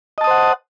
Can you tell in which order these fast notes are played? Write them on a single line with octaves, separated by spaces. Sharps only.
D#5 A5 D#6 C5 F#5